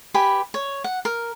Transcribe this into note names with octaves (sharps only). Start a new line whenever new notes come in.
G4 B4 G#5 B5
C#5
F#5
A#4